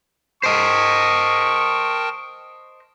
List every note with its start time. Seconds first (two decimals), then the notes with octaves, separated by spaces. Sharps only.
0.43 A#4 C5 D#5 G5 A5 C#6